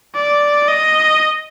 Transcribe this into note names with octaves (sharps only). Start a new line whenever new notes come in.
D5
D#5